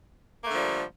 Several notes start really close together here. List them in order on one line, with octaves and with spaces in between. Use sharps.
A#3 A3 D3 F3 G3